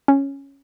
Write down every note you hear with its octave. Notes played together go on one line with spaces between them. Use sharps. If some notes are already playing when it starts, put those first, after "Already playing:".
C#4